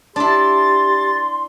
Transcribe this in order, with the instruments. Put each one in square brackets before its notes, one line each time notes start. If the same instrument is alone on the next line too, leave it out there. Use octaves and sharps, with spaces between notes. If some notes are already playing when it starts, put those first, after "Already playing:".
[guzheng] D4 E4 [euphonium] G4 [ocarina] C6 [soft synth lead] A6